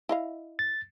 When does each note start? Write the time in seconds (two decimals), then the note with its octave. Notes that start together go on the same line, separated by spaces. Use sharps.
0.09 E4 D#5 F5
0.59 A6